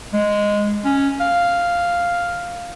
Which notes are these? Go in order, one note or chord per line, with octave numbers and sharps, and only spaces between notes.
G#3
C#4
F5